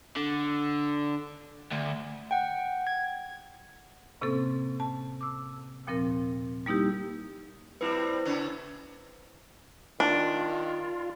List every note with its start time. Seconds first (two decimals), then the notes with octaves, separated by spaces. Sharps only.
0.17 D3
1.71 D2
2.31 F#5 G5
2.87 G#6
4.21 A2 C3 A#3 C4 C#4 A4
4.80 A5
5.21 D6 E6
5.87 D#2 A#2 F3 C4 A#4
6.66 G3 A#3 D#4 E4 G4
7.81 A#2 G3 C4 E4 B4
8.25 C#3 C#4 D4
10.00 D#3 D4 F4